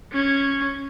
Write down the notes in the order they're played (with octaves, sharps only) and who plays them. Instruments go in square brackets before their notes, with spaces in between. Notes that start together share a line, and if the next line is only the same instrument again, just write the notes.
[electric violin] C#4 G#6